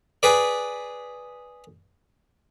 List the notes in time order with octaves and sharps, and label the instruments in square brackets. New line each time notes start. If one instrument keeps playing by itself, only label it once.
[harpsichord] G#4 B4 D5